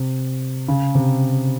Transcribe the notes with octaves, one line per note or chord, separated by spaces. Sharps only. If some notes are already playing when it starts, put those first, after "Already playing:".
Already playing: C3
C#3
C3